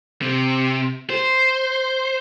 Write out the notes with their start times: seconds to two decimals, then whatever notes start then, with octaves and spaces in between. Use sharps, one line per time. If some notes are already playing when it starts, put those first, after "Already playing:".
0.22 C3
1.10 C5